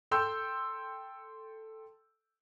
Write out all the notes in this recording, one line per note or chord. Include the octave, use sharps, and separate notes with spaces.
A4 G5 C6 E6 G6